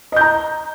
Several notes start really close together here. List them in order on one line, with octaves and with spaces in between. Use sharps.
D#5 G6 A#5